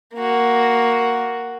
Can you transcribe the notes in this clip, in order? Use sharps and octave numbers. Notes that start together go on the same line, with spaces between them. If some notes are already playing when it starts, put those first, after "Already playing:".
A#3 F#4